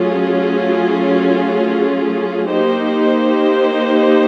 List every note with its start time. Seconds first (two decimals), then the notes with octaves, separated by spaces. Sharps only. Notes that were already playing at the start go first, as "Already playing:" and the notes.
Already playing: F#3 A3 C#4 F4 G#4
2.52 A#3 D#4 G4 C5